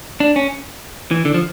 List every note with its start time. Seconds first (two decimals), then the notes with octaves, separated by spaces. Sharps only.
0.20 D4
0.36 C#4
1.11 E3
1.25 D3
1.34 F3